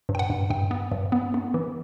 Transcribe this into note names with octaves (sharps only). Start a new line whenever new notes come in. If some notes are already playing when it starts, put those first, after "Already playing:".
G2
G5
F#5
G2
G2 G5
B3
G2
B3
B3
E3